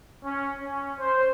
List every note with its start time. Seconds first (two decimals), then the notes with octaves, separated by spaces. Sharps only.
0.23 C#4
0.60 C#4
0.98 C5